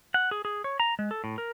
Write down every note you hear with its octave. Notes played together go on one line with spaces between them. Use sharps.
F#5
G#4
G#4
C#5
A#5
G#3
A4
A2
A#4